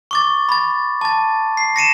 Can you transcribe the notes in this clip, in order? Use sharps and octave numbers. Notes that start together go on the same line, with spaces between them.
C#6 D6 A6
B5 A6
A5 A6
C7
A#6 C#7 D#7 E7